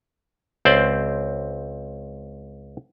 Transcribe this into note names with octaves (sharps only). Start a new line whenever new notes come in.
C#2 C4 C5 D5